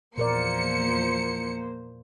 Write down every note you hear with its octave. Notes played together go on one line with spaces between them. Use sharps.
E2 A#2 F3 A#3 A#4 C5 D5 C#7